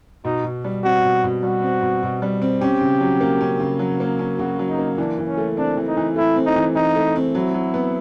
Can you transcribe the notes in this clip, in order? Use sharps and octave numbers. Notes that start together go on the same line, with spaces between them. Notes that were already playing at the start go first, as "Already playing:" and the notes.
B2 D#4
B2
G3
C4 F#4
B2
B2
G3 F#4
C4
B2
B2
G3
C4
C#4 G4
C#3
F#3
A#3
C#4
C#3
F#3
A#3
C#4
C#3 F#4
F#3
D#4
A#3
E3 D4
E3
C#4
A3
C4 D4
E3
D#4
E3
A3 E4
C4
D#4
E3
E3 D#4
A3
C4
F#3 E4
F#3
B3